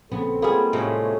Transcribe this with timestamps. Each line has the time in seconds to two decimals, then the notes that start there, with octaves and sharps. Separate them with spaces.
0.12 A#1 C#3 B3 C4 A4
0.42 G3 G#3 A#3 B3 F4 G#4
0.73 A2 C3 G#3 A3 C#4